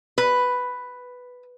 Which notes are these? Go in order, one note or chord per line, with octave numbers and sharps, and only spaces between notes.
B4